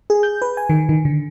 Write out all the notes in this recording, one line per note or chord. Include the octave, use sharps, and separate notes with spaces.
G#4
G6
B4
G#5
D#3
D#3
D3